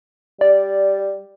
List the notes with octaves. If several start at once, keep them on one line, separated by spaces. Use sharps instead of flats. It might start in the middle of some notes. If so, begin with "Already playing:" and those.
G3 D5